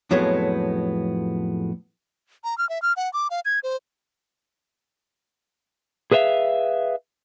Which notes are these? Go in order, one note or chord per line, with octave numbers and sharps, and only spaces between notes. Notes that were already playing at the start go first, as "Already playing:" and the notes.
F2 A2 F#3 G#3 A3 B3
A#5
F6
E5
F6
F#5
D6
F5
G#6
C5
G#4 B4 C5 E5 F5